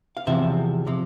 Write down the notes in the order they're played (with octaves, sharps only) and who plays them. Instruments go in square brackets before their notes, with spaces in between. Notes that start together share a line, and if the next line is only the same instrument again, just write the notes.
[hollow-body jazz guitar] F5
E2 C3 F3 E5
C3 F3